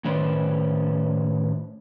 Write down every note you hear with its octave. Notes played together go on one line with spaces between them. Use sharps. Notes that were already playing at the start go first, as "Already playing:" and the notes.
A2 D#3 C#4 B4 C5 D5